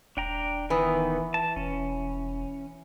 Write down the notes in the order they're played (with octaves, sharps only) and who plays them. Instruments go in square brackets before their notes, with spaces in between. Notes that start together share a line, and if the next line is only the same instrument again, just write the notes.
[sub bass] D#1 [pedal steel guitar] D4 G5 A#5
[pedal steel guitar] D#3 B3 D#6 [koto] E3
[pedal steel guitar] A5
[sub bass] E1 [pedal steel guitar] C#4